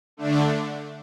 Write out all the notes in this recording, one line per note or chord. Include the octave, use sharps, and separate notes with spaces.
D3 A3 D4